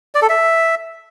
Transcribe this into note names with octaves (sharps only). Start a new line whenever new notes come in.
D5
A4
E5